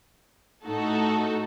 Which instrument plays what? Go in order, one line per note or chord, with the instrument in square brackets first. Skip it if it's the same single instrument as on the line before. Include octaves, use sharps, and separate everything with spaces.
[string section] A2 A3 D#4 F#4 A4